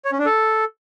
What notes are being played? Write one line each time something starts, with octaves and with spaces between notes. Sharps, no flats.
C#5
C#4
D4
A4